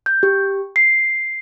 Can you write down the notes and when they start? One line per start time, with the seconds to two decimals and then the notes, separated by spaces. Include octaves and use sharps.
0.06 G6
0.23 G4
0.76 C7